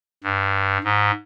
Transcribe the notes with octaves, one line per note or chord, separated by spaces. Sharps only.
G2
G#2